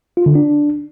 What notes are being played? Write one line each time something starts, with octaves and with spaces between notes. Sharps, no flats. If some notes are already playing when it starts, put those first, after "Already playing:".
F4
D3
D4